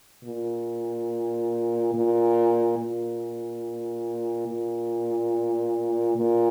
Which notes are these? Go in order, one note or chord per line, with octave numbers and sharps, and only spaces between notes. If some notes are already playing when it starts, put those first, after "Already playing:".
A#2
A#2
A#2
A#2
A#2